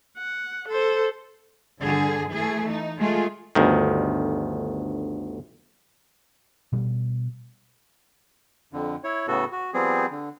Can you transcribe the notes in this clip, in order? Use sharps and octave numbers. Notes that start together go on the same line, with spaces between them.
F#5
A4 C5
G2 D3 G#4
E3 A3 G#4
D#4
G#3 A3 F4 G#4
G1 D2 D#3
B2 G3
F2 D3
E4 C#5
A2 C#3 B3 F#4 A4
F#4
F3 G3 B3 C4 G#4
D3